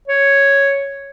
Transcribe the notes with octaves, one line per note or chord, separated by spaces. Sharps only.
C#5